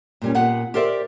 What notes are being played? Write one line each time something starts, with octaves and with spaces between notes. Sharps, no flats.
A#2 G3 C#4
A#2 B3 G4 F#5
G4 A#4 C5 D5 E5